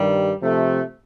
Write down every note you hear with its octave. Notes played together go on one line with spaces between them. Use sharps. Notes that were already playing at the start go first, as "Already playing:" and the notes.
Already playing: G2 D#3 G3
C3 F3 A3